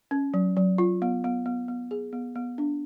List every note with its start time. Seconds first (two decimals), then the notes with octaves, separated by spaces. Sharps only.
0.11 C#4
0.34 F#3
0.57 F#3
0.78 F4
1.02 B3
1.24 B3
1.46 B3
1.68 B3
1.91 G#4
2.13 B3
2.35 B3
2.58 D4